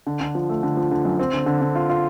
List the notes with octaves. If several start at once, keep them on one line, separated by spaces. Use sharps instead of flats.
D3
D3
F3
A3
D3
F3
D3
F#2
C4
D3
D3
D3
F4
F4